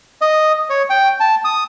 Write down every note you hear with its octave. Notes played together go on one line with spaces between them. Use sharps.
D#5
C#5
G5
A5
D#6